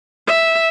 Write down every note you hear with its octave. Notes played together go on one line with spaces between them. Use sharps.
E5